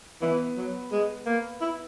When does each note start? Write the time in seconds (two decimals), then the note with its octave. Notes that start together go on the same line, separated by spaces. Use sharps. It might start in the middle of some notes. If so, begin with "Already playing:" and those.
0.22 E3 B3
0.56 F#3
0.92 G#3
1.26 A#3
1.61 E4